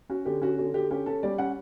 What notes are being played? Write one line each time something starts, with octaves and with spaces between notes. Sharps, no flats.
C#4 F#4
D3 G4
C#4 F#4
D3 F#4
D3 G4
C#4 G4
C#4 A4
G3 D5
C#4 F#5